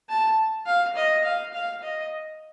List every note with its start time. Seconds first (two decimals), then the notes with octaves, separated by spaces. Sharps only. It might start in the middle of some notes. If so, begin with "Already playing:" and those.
0.09 A5
0.66 F5
0.96 D#5
1.24 F5
1.53 F5
1.83 D#5